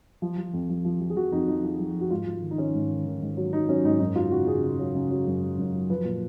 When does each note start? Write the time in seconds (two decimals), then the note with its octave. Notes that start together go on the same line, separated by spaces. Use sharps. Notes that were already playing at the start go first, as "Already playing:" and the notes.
0.22 F3
0.38 F3
0.53 F2
0.69 F3
0.85 F3
1.01 F3
1.10 G#4
1.16 F3 F#4
1.32 F2 D#4
1.48 F3 D#4
1.63 F3
1.80 F3
1.95 F3
2.01 F#4
2.10 G#2 F4
2.26 G#2
2.42 D#3
2.51 D#4
2.58 D#3 C#4
2.74 G#2
2.90 D#3
3.06 D#3
3.21 G#2
3.37 F#3
3.52 F#3 D#4
3.69 F#3 C#4
3.84 G#2 D#4
4.00 F#2 D#4
4.16 F#3 F4
4.31 C#3 F#4
4.47 C#3 G#4
4.64 C#3
4.79 F#3
4.95 C#3
5.10 F#3
5.26 F#2
5.43 F#3
5.58 F#2
5.74 F#3
5.89 F3 B4
6.05 A#2